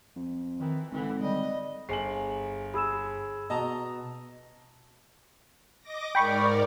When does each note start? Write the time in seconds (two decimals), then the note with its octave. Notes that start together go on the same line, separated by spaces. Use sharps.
0.16 F2
0.60 D#3 E3
0.92 G#1 D3 E3
1.22 G3 D#5
1.89 G1 G#4 G#5 C7 F#7
2.74 G#4 B5 E6 E7
3.50 B2 D#5 A5 A#5
5.81 D#5 D6 A#6
6.15 G#2 A#4 D5 G5 B5 C#6